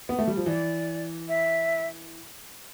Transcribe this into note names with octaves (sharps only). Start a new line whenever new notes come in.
B3
A3
G3
F3
E3 D5
E5